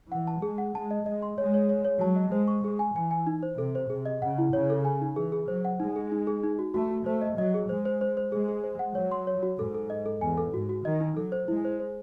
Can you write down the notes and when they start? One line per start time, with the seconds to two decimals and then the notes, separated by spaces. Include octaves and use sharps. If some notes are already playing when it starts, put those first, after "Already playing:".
0.12 E3 F#5
0.27 A5
0.42 G#3 G#4
0.58 F#5
0.74 G#3 A5
0.91 D#5
1.05 G#3 D#5
1.22 C6
1.38 G#3 C#5
1.54 C#5
1.69 C#5
1.85 C#5
2.01 F#3 A5
2.16 D#5
2.32 G#3 C5
2.48 C#6
2.64 G#3 G#4
2.79 G#5
2.95 E3 G#5
3.11 G#5
3.27 D#4
3.43 C5
3.58 C3 A4
3.75 C5
3.90 C3 G#4
4.06 D#5
4.22 C#3 F#5
4.38 E4
4.53 C#3 C#5
4.70 A4
4.85 G#5
5.01 D#4
5.16 E3 G#4
5.32 G#4
5.48 F#3 C5
5.65 F#5
5.80 G#3 D#4
5.96 G#4
6.12 D#4
6.27 G#4
6.44 D#4
6.59 F#4
6.74 A3 F#4
6.91 F#4
7.06 A3 C5
7.21 D#5
7.38 F#3 D#5
7.54 G#4
7.69 G#3 C5
7.85 C5
8.01 C5
8.17 C5
8.32 G#3 G#4
8.48 G#4
8.64 C5
8.79 F#5
8.95 F#3 C#5
9.12 C6
9.27 C#5
9.43 F#4
9.59 G#2 A4
9.74 A4
9.90 D#5
10.06 A4
10.21 E2 G#5
10.37 A4
10.53 G#2 F#4
10.69 F#4
10.85 D#3 D#5
11.00 D#4
11.17 F#3 A4
11.32 C5
11.48 G#3 E4
11.65 C5
11.80 C5